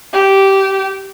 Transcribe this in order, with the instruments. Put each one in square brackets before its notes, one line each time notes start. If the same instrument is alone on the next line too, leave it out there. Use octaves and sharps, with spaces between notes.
[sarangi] G4